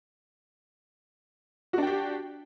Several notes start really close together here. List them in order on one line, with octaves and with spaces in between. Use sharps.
F#4 D4 G5 G4